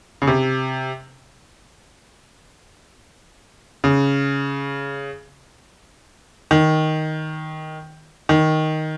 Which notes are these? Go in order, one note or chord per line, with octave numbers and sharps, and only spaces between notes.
C#3
C3
C#3
D#3
D#3